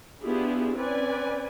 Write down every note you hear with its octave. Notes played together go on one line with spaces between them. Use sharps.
B3 D4 E4 F4 G4 G#4
C4 C#4 B4 D5 G#5